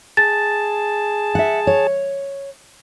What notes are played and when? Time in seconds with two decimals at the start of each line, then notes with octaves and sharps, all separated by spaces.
0.17 G#4 A5 A6
1.35 E5 F#5
1.67 C#5